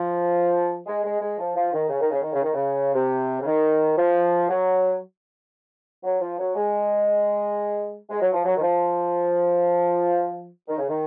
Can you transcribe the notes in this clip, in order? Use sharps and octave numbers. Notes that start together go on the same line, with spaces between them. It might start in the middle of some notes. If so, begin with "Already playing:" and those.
Already playing: F3
G#3
G#3
G#3
F3
F3
D#3
C#3
D#3
C#3
D#3
C#3
D#3
C#3
C3
C#3
D#3
F3
F#3
F#3
F3
F#3
G#3
G#3
F#3
F3
F#3
D#3
F3
D#3
C#3
D#3